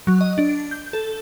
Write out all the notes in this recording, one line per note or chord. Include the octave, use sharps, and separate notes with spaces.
F#3
D#5
D4
G6
A4